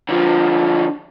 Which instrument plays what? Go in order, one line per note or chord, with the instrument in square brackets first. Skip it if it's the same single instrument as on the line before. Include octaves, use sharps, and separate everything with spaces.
[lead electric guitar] D3 F3